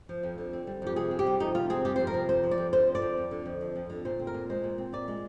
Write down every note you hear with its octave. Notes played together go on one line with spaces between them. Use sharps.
F3
F2
D3
C4
G3
F2 G4
C3 G#4
C4
G4
G3
F2 D#4
C3 F4
C4 G#4
G3 G4
F2 C5
A#4
C3
F2 C5
F3
D5
F2
D3 C5
F2
D5
F3
F2
D3
F2
F3
F2
D3
A#2 C5
C4
A#4
A#2
G#3 C5
A#2
C4
A#2 D5
G#3